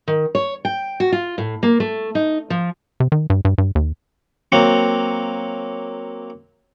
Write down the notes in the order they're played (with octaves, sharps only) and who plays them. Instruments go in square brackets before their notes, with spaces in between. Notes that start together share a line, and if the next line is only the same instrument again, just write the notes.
[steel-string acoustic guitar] D#3
C#5
G5
F#4
F4
A2
A#3
A3
D#4
F3
[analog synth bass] C3
D#3
G2
G2
G2
D#2
[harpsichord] F#3 A#3 C4